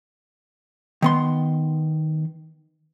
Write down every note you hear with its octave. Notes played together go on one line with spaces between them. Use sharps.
D#3 B3 C6